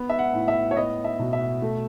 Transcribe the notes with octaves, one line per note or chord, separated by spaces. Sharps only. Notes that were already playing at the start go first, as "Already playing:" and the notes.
Already playing: B3
E5
F#5
A2
E5
C#5
B3 D#5
E5
B2
E5
A3